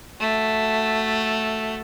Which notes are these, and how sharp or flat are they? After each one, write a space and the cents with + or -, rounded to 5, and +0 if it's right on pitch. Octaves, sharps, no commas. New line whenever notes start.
A3 +0 F#4 +0